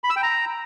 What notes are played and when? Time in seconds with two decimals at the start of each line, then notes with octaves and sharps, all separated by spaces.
0.04 B5
0.10 E6
0.16 G5
0.22 A#5